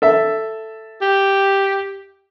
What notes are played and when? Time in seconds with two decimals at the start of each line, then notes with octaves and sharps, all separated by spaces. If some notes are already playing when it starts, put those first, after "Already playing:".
0.02 A4 E5
1.02 G4